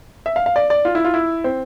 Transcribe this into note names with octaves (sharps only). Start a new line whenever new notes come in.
E5
F5
F5
D5
D5
F4
E4
F4
E4
C4